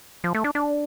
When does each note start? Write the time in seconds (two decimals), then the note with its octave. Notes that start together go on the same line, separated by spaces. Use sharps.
0.24 F3
0.35 A3
0.44 D4
0.55 D4